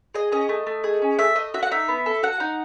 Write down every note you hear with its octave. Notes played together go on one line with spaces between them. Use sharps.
G#4 D#5
C#4 D#5
A3
A3
G#4
C#4
A3 E5
A3 D#5
F#4 E5
F#5
D#4 E5
B3
A4
F#4 F#5
D#4